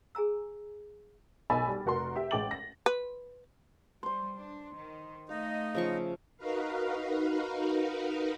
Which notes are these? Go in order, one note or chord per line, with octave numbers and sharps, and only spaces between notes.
G#4 G#5 A#5 E6
B1 D#5 G#5 B5 E6 A6
G3
F1 F#4 A#4 C6
G4 E5
A1 G#3 G5 D6 A6 F#7
A#6
B4
G3 C5 C6
D4
D#3
A3 D#4 D#5 F5
C#3 F3 E5 C#6
D#4 F#4 A#4 B4 F5